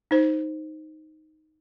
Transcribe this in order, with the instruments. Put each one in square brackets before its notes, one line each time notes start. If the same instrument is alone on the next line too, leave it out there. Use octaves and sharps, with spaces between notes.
[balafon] D#4 C5